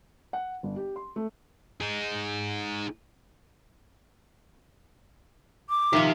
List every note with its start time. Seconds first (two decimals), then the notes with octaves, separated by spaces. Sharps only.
0.33 F#5
0.63 G1
0.76 G4
0.96 C6
1.16 A3
1.80 D#4 G#4
5.70 D6
5.93 D#3 F3 G4 E5